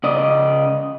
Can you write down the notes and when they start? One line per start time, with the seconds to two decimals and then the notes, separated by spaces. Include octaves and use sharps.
0.04 C#3 D5 D#5